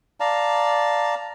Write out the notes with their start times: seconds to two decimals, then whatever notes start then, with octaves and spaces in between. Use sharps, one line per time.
0.20 D5 F5 A5 A#5